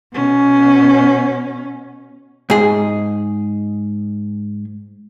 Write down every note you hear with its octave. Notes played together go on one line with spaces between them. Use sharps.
B2 C#4
G#2 G#4